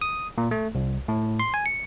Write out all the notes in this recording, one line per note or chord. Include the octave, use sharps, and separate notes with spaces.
D#6
A#2
A3
C2
A2
C6
G#5
C#7